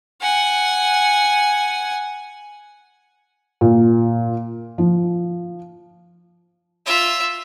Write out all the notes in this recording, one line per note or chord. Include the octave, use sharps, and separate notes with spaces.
F#5 G#5
A#2
F3
F4 E5